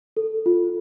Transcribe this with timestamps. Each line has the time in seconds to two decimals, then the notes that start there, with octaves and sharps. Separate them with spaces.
0.17 A4
0.46 F4